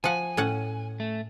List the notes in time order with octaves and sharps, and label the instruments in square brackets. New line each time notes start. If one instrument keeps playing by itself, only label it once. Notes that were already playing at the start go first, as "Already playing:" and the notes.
[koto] F3 F#5 [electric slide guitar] G#5
[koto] A2 C#4 F#5
[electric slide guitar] A3